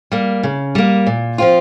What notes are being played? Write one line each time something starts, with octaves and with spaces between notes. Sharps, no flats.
G3 A#3
C#3
G3 A#3
A#2
F3 C4 F4